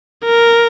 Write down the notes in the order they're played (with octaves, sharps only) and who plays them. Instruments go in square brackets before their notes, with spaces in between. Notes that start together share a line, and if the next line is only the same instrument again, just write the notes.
[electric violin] A#4